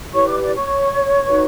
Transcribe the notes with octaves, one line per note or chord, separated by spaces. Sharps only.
E4 G4 B4 C#5 C#6
D5 D6
D5 D6
C#5 C#6
D#4 F#4 B4